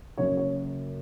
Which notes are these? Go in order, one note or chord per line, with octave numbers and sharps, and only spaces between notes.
F#1 F#2 C#3 C#5
C#5